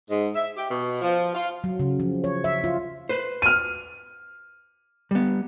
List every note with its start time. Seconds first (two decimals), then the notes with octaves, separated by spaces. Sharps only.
0.10 G#2
0.36 E5
0.56 G4
0.69 B2
1.01 F3
1.34 F4
1.64 F#3
1.80 C#3
2.00 F3
2.24 C#5
2.44 E5
2.64 F4
3.09 B4 C5
3.42 F6 D#7
5.11 G3 B3